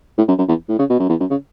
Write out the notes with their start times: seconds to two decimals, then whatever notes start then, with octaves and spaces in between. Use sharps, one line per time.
0.17 A2
0.28 F#2
0.38 F#2
0.48 E2
0.69 A2
0.79 C#3
0.90 B2
0.99 F#2
1.09 E2
1.20 F#2
1.30 C#3